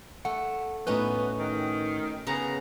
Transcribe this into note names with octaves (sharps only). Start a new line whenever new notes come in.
A3 F#5
A2 B3 C#4 D#4 F#4 B4
D#3
C#3 B3 G#4 F#5 A#5